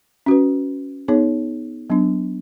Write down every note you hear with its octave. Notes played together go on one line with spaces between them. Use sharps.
C#4 F#4 B4
B3 D#4 G#4 C#5
F#3 B3 D4